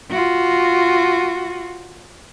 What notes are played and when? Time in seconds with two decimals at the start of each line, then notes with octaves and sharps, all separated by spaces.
0.10 F4 F#4